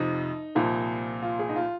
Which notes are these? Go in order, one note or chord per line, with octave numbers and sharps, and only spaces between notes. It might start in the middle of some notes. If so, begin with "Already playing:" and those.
Already playing: F2 C3 F3 D#4
C2 A#2 F3
F4
G#4
D#4
F4